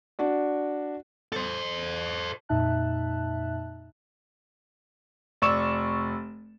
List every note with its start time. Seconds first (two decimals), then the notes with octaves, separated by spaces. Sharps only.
0.19 D4 F#4 D5
1.33 A4 C5
2.49 F2 A#2 D#4 E5 A5 F#6
5.42 F1 D5 C#6 E6 E7